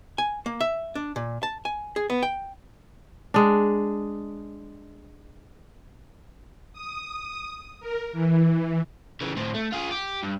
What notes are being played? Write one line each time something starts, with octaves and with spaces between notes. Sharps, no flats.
G#5
A#3
E5
D4
A#2
A5
G#5
G#4
B3
G5
G#3 D4
D#6
A#4
E3
C#3 E3
A2 C4
A3
F4 G#4
G4
G2